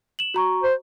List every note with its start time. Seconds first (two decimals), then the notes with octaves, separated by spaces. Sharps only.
0.19 E7 F#7
0.34 F#4 A#5 C#6
0.63 C5